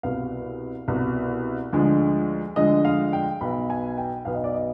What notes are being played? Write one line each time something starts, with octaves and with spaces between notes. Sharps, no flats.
C2 B2 B3 F5
C2 B2 B3
D2 D3 F3 G#3
D2 D3 F3 G#3 D#5
F5
G5
B1 B2 B3 B5
G#5
G5
B1 B2 B3 F5
D#5
D5
D#5